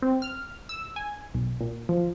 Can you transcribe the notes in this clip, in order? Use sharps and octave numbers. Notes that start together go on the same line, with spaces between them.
C4
F6
E6
G#5
B1
A#2
F3